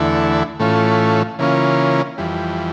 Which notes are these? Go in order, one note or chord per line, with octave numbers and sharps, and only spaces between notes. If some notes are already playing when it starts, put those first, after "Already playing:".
Already playing: E2 D3 A3 E4
A2 E3 A3 C#4 F4
C#3 E3 A#3 C#4 F4
F2 E3 G3